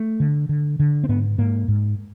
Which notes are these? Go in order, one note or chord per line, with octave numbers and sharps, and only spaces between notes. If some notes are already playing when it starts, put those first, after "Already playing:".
Already playing: A3
D3
D3
D3
C4
G#2 B3
G#2 A#3
G#2